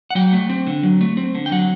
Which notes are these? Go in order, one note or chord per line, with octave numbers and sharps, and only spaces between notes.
F#5
F#3 G5
A3
C4
D3
F#3
A3
C4
D3
G5
F#3 F#5